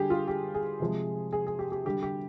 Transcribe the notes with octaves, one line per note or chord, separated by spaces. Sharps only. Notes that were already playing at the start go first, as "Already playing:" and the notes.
Already playing: D3 G3 G4 G#4
F4
G4
G#4
C3 F3 G#3
G#4
G#4
G4
G4
D3 G3 G4
G4